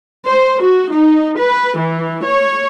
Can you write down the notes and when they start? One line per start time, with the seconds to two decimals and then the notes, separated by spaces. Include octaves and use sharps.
0.26 C5
0.60 F#4
0.91 D#4
1.38 B4
1.78 E3
2.24 C#5